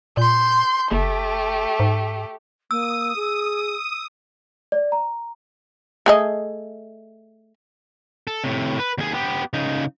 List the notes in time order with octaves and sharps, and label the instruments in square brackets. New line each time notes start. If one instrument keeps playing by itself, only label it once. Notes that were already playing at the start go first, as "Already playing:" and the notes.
[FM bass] A#2 [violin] C6 G6
[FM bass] F#1 [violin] A3 G4
[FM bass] G#2
[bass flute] A#3 [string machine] D#6 [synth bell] E6
[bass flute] G#4
[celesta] D5
A#5
[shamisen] A3 G#4 D#5
[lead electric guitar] A4
A2 C3
B4
D#2 G#4
B3 G4
C#3 D#4